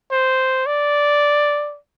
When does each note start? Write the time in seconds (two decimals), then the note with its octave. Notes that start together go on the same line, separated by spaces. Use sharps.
0.11 C5
0.66 D5